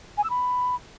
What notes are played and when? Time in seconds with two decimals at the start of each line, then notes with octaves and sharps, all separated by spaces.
0.17 G#5
0.23 E6
0.30 B5